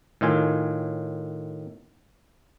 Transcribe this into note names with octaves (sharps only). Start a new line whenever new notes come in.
A2 D#3 F4 G#5